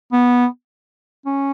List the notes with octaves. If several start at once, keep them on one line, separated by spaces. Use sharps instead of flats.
B3
C#4